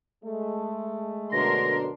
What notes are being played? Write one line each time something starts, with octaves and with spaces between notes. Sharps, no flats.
G#3 A3
F#2 B2 D3 D4 A#4 C6 A#6